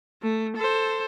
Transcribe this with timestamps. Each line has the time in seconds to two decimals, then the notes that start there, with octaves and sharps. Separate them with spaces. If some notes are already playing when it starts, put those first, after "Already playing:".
0.22 A3
0.56 A4 C5